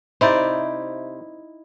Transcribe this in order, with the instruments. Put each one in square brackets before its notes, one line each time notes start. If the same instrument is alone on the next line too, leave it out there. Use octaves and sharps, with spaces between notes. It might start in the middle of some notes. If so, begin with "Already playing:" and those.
[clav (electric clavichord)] C3 C5 [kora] D#4 E4 D5